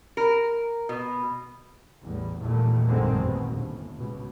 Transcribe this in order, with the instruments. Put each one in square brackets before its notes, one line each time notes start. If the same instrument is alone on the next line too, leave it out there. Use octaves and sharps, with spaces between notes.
[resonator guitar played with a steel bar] A#4
B2
[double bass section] A1 E2 G3
E2 A#2 D#3 G3 A3
A1 F#2 D3 D#3 G#3 C4
D#2 B2
G1 A2
C#2 B2